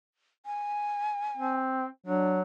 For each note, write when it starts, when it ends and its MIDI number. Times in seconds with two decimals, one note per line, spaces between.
0.46 1.58 80
1.37 1.86 60
2.06 2.42 54
2.06 2.37 62